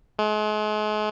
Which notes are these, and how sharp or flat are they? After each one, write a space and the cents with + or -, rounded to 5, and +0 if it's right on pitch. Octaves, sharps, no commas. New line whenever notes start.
G#3 +40